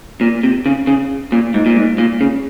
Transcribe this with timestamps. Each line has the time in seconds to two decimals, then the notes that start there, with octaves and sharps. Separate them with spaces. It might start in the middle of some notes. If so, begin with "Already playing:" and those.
0.21 A#2
0.43 C3
0.66 C#3
0.87 C#3
1.32 A#2
1.54 G#2
1.66 A#2
1.77 G#2
1.98 A#2
2.21 C#3